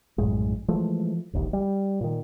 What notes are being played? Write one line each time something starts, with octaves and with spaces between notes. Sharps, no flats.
A#1 F#2 A2 G#3
E3 F3 G#3 A3
E1 A#1 D#2
G3
A#2 D#3